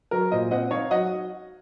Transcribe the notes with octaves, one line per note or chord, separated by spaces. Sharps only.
F#3 A#4
A#2 C5 D#5
C4 D#5 F#5
D#4 C#5 F5
F#3 D#5 F#5